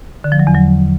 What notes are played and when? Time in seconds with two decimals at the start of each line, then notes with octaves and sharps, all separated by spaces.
0.24 D3
0.32 F3
0.39 F#3
0.47 E2
0.55 F#3